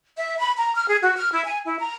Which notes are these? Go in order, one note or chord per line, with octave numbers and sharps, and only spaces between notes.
E5
B5
A#5
F6
G#4
F#4
F6
E4
G#5
E4
A#5